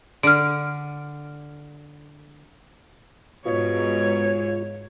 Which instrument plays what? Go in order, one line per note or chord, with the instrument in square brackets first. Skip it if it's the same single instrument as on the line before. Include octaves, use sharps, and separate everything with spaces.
[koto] D3 [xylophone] F6 D7
[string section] G#2 [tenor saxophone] B2 [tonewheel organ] F4 [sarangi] C#5